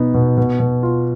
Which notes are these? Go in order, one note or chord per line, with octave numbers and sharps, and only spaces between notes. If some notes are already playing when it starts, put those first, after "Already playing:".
Already playing: B2 B3 D#4
B2
B2
B2
F4